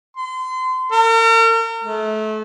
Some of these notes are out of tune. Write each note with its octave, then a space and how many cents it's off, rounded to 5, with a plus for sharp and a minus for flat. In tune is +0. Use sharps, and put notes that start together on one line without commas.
C6 -30
A#4 -40
A3 -30